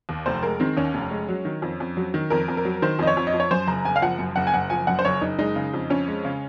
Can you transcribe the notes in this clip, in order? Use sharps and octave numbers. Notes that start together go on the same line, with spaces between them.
D#2
F1 C5
G#3 A#4
D#3 C4
D#2 C#4
F1
G#3
F#3
D#3
F2
F2
F#3
D#3
F2 A#4
F2
A#4
F#3
D#3 C5
F2 D#5
C#5
F2
D#5
F3
C#5
F#2 C5
F#1 A#5
F#1 G#5
F5
F3 F#5
F#2
F#1 F#5
G#5
F#1 F#5
F3 G#5
F#2 F#5
C5
F#1 C#5
F#1 D#4
G#3 D#4
C#3
F2
F2 C#4
G#3
C#3